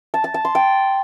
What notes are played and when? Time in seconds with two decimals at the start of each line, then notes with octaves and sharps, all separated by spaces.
0.14 A5
0.24 A5
0.34 A5
0.45 C6
0.55 G5